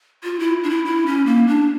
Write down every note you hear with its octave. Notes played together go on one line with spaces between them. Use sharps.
F4
E4
D4
E4
E4
C#4
A#3
D4